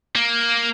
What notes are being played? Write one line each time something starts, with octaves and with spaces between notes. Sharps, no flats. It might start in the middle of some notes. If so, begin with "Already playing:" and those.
A#3